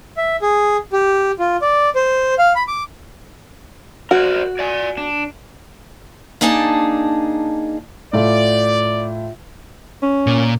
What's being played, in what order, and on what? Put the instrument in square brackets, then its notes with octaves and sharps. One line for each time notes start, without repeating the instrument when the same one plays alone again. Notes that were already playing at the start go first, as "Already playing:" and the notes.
[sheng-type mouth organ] E5
G#4
G4
F4
D5
C5
F5
B5
D6
[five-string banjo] F#4 [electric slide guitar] A#4 C5 D5
[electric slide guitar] D5 G#5
D4
[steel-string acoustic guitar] A#3 D4 D#4 G#4 A5
[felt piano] A2 F4 A4 [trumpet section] D5
[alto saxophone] C#4
[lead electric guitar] A#2